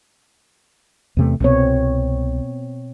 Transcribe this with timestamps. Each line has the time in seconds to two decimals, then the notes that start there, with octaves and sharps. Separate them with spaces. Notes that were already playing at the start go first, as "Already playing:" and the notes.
1.17 E2 C3 A3
1.40 C2 B2 B3 C4 C#5